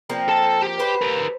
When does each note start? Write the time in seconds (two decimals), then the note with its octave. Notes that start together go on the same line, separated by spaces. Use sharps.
0.10 F3 A#3 C4
0.28 A4 A5
0.62 G4 G5
0.79 B4 C5
1.01 G4 A#4